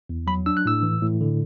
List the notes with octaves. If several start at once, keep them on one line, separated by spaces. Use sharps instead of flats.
E2
F#3 B5
D4 E6
F#6
A2 E6
E3
A2
D3